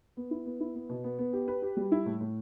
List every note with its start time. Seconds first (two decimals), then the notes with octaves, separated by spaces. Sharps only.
0.17 B3
0.31 E4
0.46 B3
0.60 E4
0.75 B3
0.89 B2
1.04 B3
1.19 B3
1.33 G4
1.48 B4
1.62 G4
1.77 G3
1.92 E4
2.06 A2
2.21 A2